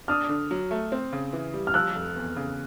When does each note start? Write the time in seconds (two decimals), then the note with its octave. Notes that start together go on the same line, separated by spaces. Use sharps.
0.08 D4 D#6 F6
0.29 D3
0.51 F#3
0.71 A3
0.92 C4
1.12 C#3
1.33 E3
1.54 G3
1.67 F6
1.74 F3 E6 F#6
1.95 F1
2.16 E2
2.36 C#3